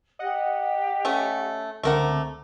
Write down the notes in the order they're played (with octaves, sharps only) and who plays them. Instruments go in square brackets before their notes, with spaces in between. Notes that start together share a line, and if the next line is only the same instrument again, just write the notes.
[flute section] G4 [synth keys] D#5 F#5
[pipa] A3 C#4
[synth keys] C#2 D3 C4 [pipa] A3 A#4 F#5 [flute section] A#5 D6